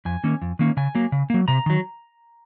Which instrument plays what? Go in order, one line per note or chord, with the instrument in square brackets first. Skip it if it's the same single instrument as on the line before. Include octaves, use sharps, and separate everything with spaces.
[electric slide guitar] F2 G#5
D#3 A#3 C#4
F2
D#3 A#3 C#4
C#3 G#5
F#3 A#3
C#3
F#3 A#3
C3 A#5
D#3 F#3